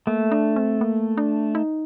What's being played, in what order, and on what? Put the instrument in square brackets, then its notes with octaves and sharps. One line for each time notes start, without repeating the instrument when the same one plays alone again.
[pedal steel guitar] A3 [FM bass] A#3
[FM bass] D4
C4
A#3
D4
D#4